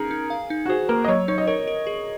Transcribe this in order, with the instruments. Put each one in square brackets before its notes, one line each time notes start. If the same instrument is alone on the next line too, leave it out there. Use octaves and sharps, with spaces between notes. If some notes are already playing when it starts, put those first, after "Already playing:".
Already playing: [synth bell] C#4 D#4 [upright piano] G#4 A#4
[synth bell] D#4
F5
D#4
[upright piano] F#4
[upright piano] G#4 [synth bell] C5
[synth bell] A#3 [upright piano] A#4
[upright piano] D#5
[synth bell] F#3 [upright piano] C#5
[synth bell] D#4 [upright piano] C#5
[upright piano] D#5
[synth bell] A#4 [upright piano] C#5
[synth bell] A#4
G#4